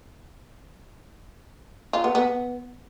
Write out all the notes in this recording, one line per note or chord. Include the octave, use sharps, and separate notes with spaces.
F4
B3
B3